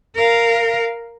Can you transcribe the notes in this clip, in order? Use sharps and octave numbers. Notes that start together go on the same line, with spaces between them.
A#4 F5